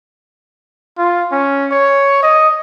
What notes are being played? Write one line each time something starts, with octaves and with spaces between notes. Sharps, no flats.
F4
C#4
C#5
D#5